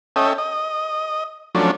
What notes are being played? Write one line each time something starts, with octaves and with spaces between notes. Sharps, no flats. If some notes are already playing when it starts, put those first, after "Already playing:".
C#4 A4 D#5 E5 G5
D#5
F3 F#3 A3 C#4 D4